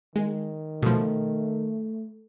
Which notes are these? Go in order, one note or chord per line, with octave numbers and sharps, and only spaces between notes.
D#3 G#3
B2 F3 A3